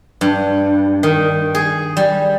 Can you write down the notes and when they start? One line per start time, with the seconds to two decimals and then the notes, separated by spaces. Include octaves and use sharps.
0.21 G2
1.03 D#3
1.55 G#4
1.97 G3